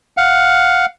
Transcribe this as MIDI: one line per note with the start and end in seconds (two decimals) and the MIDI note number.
0.17 0.86 77
0.17 0.86 78